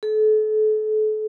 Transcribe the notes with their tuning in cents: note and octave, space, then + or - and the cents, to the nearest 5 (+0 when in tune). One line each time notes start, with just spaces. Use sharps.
A4 -35